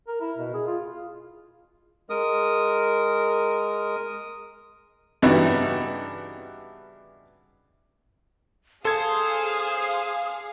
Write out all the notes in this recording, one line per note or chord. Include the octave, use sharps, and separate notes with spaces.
A#4
E4
B2
G#4
F4
G#3 A#4 D#6
G2 C#3 E3 B3 D#4 F#4
G#4 A4 C5 F5 D#6 G#6